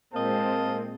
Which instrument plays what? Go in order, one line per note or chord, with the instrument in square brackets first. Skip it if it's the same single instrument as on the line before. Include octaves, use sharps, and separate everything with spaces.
[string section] A#2 G#3 C4 [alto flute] A#4 [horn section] D#5 F5 A5